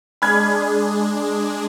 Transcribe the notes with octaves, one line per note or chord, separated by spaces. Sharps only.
G#3 D4 G#4 B5 F6 G#6